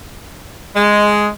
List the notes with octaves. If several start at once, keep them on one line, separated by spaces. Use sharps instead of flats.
G#3